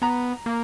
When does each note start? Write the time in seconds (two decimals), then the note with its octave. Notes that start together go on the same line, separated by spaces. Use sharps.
0.02 B3 A#5
0.46 A#3